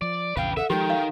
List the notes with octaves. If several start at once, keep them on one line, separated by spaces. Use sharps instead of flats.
F3 D5
A#1 E2 C#3 B4 F5 G5
A4 E5 F#5
D#3 F3 G#3 G4 G5
F5